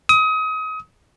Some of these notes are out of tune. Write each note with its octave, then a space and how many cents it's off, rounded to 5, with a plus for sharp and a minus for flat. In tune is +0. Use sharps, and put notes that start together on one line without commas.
D#6 +30